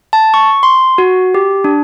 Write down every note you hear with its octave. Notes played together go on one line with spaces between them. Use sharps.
A5
C#6
C6
F#4
G4
D4